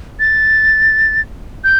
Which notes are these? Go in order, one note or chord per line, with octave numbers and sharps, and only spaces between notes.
A6
G6